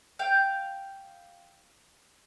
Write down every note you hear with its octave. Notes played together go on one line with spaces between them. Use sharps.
F5 G5